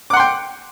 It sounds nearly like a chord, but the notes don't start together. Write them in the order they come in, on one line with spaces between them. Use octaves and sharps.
D6 F#5 C6 G5